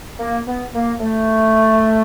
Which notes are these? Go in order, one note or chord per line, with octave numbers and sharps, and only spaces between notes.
A#3
B3
A#3
A3